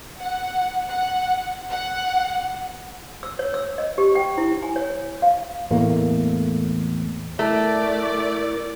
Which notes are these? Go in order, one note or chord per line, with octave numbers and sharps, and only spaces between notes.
F#5
F#5
F#5
E6
C#5
E6
D#5
G4
G5
E4
G#5
C#5
F5
E2 A2 A3 A#3
A3 E4 A#4 D5